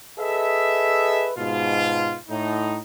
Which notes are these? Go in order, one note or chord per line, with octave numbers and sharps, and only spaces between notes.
G#4 A4 B4 D#5 E5
G#2 B2 F4
A2 D#4